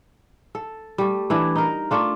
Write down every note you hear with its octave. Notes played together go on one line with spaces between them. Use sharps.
A4
G3 A3
E3 D4 E4
D#4 A#4
A3 D4 F4